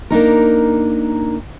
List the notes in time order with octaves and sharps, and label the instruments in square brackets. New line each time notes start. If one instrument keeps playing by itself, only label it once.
[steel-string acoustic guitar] A#3 D4 D#4 A#4